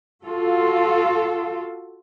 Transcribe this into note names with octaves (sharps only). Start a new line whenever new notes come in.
F4 F#4 A4